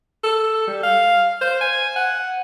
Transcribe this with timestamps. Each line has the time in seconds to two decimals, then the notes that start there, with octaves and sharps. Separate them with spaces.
0.23 A4
0.67 G3
0.83 F5
1.41 C5
1.61 G#5
1.96 F#5